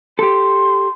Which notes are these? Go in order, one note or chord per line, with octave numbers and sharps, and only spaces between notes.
G4 A4 C6